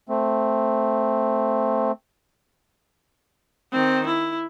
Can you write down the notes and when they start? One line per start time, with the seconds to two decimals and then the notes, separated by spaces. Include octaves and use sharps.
0.09 A3 C4
3.72 D#3 C4
4.06 E4